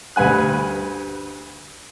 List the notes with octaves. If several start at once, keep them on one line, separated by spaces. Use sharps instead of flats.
D2 G2 B4 G#5 F#6